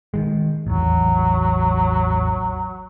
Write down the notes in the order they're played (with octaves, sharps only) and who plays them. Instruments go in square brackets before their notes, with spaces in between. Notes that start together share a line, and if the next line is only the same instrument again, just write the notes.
[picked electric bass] D#3 E3 G#3
[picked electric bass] A1 E2 [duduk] F#3